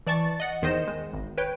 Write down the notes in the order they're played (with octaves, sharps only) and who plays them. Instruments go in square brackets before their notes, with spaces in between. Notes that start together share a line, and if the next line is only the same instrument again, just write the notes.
[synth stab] E3 D5 A5 C#6 A6
D#5 F#5
E2 D#3 C5 D#5 E7
G#3
G#1
B4 C#5 G5